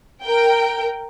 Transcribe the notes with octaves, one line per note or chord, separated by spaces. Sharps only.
A#4 G5